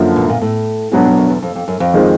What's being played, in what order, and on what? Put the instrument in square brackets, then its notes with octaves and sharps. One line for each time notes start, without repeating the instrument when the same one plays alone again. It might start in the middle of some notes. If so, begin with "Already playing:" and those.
Already playing: [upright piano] F#2 D3 F3 A#3 D4
[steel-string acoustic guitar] B2
A#2
A2
[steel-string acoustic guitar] G#2 [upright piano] B2 F#3 B3 D4
[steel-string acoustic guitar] G2
F#2
E2
F2
F2
F#2
F2
[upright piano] D#3 G#3 C4 F4